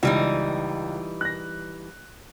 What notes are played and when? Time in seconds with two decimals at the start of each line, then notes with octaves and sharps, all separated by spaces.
0.03 C#2 E3 G3 D#4
1.21 F#6 A#6